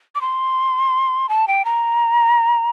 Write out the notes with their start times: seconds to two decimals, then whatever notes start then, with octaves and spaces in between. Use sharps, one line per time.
0.15 D6
0.21 C6
1.29 A5
1.48 G5
1.65 A#5